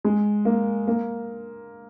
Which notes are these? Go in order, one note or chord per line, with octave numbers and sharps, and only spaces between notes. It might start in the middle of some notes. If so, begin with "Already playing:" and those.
G#3
A#3
A#3